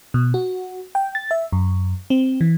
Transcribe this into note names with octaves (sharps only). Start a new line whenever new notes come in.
B2
F#4
G5
A6
E5
F#2
C4
E3